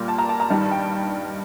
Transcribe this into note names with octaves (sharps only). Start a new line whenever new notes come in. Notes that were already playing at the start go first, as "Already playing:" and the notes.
Already playing: A#2 G3 A#3
A5
A#5
A5
A#5
G2 D#3 G3 A5
G5